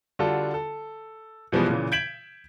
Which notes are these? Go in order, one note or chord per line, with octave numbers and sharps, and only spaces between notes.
D3 G3 D4 F4 F#4 A4
A4
B2 E3 F3 G3 G#3 B3
A#2 C#3 E3
G6 G#6 B6 D7 E7 F#7